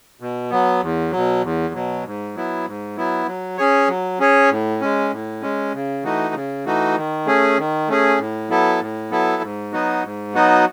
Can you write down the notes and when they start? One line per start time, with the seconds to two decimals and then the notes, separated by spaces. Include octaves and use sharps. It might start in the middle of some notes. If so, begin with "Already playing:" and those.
0.20 B2
0.50 F#3 B3
0.81 E2
1.11 B2 F#3
1.42 E2
1.74 B2 F#3
2.05 G#2
2.35 F#3 B3 E4
2.66 G#2
2.97 F#3 B3 E4
3.27 F#3
3.58 C#4 G#4 C#5
3.88 F#3
4.20 C#4 G#4 C#5
4.50 A2
4.81 G#3 C#4
5.12 A2
5.42 G#3 C#4
5.73 C#3
6.03 E3 A3 D#4 F#4
6.34 C#3
6.66 E3 A3 D#4 F#4
6.96 D#3
7.26 A3 C#4 G#4
7.58 D#3
7.89 A3 C#4 G#4
8.18 A2
8.49 F#3 B3 E4 A4
8.80 A2
9.11 F#3 B3 E4 A4
9.42 G#2
9.72 F#3 B3 D#4 F#4
10.04 G#2
10.35 F#3 B3 D#4 F#4